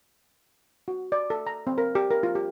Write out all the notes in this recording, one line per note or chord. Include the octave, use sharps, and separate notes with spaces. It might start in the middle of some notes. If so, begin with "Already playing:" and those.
F#4
D5
A4
A#5
C4
A#4
G4
A#4
F4
G4